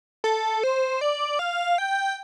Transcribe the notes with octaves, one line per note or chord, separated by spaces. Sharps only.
A4
C5
D5
F5
G5